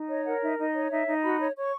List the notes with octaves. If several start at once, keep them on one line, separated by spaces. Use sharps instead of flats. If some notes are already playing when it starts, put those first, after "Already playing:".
Already playing: D#4
C#5 D#5
A#4 F#5
D#4 E5
D#4 D#5
C#5
D#4 E5
D#4
F#4 B5
C#5
C#5 C#6